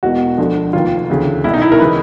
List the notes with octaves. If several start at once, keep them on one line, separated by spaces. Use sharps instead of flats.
E1 E2 B2 F#4
D2 D3 F3
F1 D#2 D#3 F4
D2 C#3 E3
C2 B2 E4
D#4
E4
A#4
C#3 E3 B4